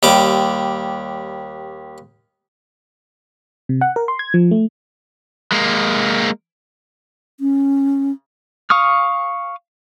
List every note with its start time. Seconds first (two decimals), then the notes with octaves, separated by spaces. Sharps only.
0.03 D#2 G3 D6
3.69 C3
3.81 F#5
3.96 A#4
4.08 C6
4.19 G#6
4.34 F3
4.51 A3
5.52 G#3 A#3
7.40 C#4
8.70 F5 C#6 D#6 F6